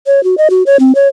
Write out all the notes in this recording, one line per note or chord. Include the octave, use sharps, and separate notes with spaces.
C#5
F#4
D#5
F#4
C#5
C4
C#5